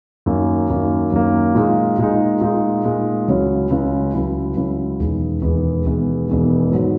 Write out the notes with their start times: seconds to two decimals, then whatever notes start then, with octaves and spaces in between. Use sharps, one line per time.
0.26 F#2 D#3 A#3
0.69 F#2 D#3 A#3
1.12 F#2 D#3 A#3
1.55 A#2 G#3 D#4
1.98 A#2 G#3 D#4
2.41 A#2 G#3 D#4
2.84 A#2 G#3 D#4
3.28 C#2 C#3 F#3 C#4 E4
3.70 C#2 C#3 F#3 C#4 E4
4.13 C#2 C#3 F#3 C#4 E4
4.56 C#2 C#3 F#3 C#4 E4
4.99 E1 E2 D#3 G#3
5.42 E1 E2 D#3 G#3
5.85 E1 E2 D#3 G#3
6.28 E1 E2 D#3 G#3
6.71 G#2 D#3 F#3